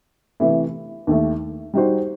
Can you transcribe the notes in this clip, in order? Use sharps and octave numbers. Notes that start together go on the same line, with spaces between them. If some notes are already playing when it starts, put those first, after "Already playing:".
C3 E3 A3 E4
D#2 D#3 A3
G3 D#4 F#4 C5